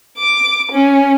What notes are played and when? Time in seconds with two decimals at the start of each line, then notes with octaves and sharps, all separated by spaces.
0.18 D6
0.72 C#4